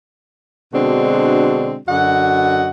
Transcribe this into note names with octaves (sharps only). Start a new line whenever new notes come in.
B2 D3 G#3 C4 D4 F#4
F#2 D3 F#4 D#5 F#5